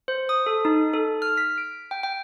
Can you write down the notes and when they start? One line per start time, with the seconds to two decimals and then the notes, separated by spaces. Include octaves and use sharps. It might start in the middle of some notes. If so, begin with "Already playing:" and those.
0.08 C5
0.29 D#6
0.46 A4
0.65 D#4
0.93 A4
1.22 F6
1.37 B6
1.58 D7
1.91 G5
2.03 G5